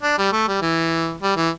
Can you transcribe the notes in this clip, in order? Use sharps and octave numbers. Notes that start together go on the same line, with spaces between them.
D4
G3
A3
G3
E3
G3
E3